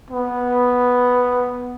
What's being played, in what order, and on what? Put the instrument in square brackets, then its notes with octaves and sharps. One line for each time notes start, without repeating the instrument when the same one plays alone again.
[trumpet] B3